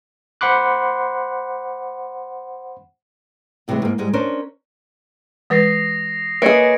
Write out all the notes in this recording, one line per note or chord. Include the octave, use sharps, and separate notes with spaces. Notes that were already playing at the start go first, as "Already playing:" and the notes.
C5 F#5 B5 C6 D6 F#6
A2 C3 E3 F#3 G#3
G#2 A#3
G#2 G3 G#3
C#4 D4 A#4 C5
E3 G#3 B4 D#6 A#6 C7
A#3 G#4 B4 C#5 D#5 E5 C#7 D7